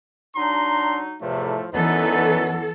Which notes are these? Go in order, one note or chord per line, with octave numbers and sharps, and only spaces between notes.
F#3 D4 D#4 A#5 C6
E2 A2 C3 F3 A3
F#2 D3 E3 F#3 B3 D#4 A4 B4